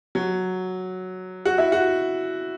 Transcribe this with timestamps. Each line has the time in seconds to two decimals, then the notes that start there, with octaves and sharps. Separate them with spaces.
0.15 F#3
1.45 F#4
1.58 E4
1.72 F#4